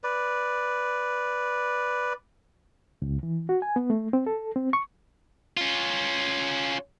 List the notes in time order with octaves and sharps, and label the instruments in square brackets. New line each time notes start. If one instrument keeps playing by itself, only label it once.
[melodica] B4 D5
[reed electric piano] C#2
E3
F#4
G#5
B3
A3
C4
A4
C4
C#6
[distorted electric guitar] C#4 F4